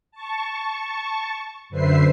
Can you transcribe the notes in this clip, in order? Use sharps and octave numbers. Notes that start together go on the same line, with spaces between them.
A5 C#6
F#2 D3 B4 C5 E5 C7